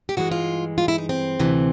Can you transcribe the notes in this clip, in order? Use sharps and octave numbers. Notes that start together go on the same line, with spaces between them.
G4
G2 E3 G#3 F#4
F4
F4
E4
D#4
C4
D2 C3 E3